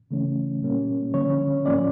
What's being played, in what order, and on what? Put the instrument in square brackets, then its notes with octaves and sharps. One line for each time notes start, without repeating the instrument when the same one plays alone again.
[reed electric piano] C#3 E3 A3 C#4
A#2 G3 A#3 C#4
D3 F3 C#4 C#5
A2 F3 A#3 C#4 D5